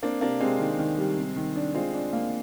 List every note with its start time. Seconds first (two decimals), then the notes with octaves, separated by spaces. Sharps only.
0.03 A#3 C4 D4
0.21 C3 A#3 D4
0.40 C3 G#3 C4
0.59 D#3
0.79 D#3
0.98 G3
1.18 C3
1.36 D#3
1.56 D4
1.74 G#3 C4 F4
1.93 D4
2.13 A#3